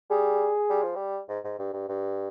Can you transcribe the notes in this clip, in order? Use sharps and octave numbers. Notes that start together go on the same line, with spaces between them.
G3 G#4
G3
F3
G3
G#2
G#2
G2
G2
G2